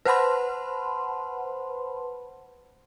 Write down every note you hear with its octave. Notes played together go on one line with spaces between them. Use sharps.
B4 C5 F#5 A5 B5 C6